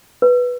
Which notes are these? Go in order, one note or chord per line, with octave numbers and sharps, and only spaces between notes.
B4